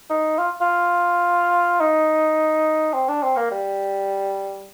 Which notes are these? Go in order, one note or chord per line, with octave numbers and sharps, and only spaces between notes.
D#4
F4
F4
D#4
C4
D4
C4
A#3
G3